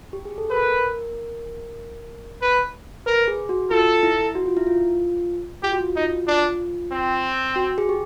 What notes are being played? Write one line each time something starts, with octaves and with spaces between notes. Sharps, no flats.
G4
G#4
A4
A#4 B4
B4
A#4 B4
G#4
F#4
F4 A4
E4
F#4
F4
E4
F4
F4 G4
F#4
F4
F#4
D#4 F4
D4 F4
C4
F#4
G#4
G4